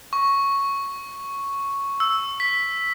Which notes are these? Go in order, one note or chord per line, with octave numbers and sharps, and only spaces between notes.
C#6
E6
B6